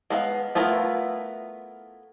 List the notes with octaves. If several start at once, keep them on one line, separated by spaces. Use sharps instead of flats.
G#3 B3 A4 F5
A3 B3 E4 F4 A#4